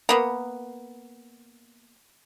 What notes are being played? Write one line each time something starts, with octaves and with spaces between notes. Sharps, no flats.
A#3 B3